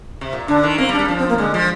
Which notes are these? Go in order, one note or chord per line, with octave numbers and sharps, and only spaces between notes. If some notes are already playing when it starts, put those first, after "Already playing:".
C3
A#2
D3 D4
D#3
A#3 C4
G3
D4
G3
F3 D4
C4
A#3
D3 G#3
F3